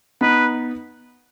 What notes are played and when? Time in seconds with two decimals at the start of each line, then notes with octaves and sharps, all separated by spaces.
0.21 B3 D#4 B4